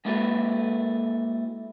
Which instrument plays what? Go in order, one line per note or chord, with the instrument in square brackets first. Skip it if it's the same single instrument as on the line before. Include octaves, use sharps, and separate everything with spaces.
[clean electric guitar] G#3 A#3 E4 F#4 A4 B4